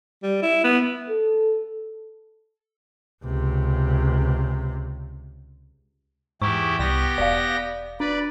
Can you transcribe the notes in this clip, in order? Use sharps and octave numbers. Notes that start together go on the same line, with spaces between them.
G3
E4
B3
A4
C#2 C3
E2 G#2 E4 G4 C#6
C2 B3 G4 A#6
E1 D5 F5
D4 B4 D5